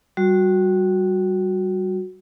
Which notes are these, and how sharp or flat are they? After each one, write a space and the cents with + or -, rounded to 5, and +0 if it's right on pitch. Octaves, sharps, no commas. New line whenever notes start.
G3 -20 F#4 -10